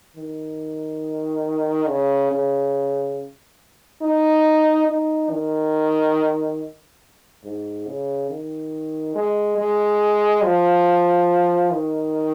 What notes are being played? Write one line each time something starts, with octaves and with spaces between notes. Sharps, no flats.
D#3
C#3
C#3
D#4
D#4
D#3
G#2
C#3
D#3
G#3
G#3
F3
D#3